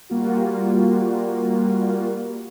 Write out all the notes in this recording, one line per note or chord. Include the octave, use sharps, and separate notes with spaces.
G3 A#3 F4 F#4